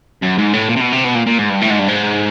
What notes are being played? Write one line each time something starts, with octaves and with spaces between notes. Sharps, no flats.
F#2
G#2
A2
A#2
C3
B2
C3
B2
A#2
A#2
G#2
G2
A2
G#2
G2
G#2